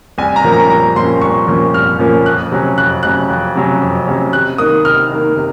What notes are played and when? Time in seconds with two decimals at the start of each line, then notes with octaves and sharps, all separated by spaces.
0.18 C2 G#5
0.36 A#5
0.44 A#2 F3 A#3 C#4
0.53 A#5
0.70 C2 A#5
0.96 A#2 F3 A#3 C#4 C6
1.21 C2 C#6
1.47 A#2 F3 A#3 C#4
1.74 C2 F6
1.99 A#2 F3 A#3 C#4
2.25 F2 F#6
2.52 C3 F#3 C#4
2.77 F2 F#6
3.03 C3 F#3 C#4 F#6
3.29 F2
3.55 C3 F#3 C#4
3.81 F2
4.06 C3 F#3 C#4
4.33 C3 F#6
4.58 D#3 A#3 D#6
4.84 C3 F6
5.11 D#3 A#3
5.37 C3